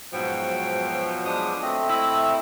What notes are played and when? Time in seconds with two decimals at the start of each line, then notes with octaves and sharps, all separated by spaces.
0.13 G#2 B2 F3 F#3 G5
1.25 G#3 D4 D#6
1.62 A3 C4 D#5
1.89 E4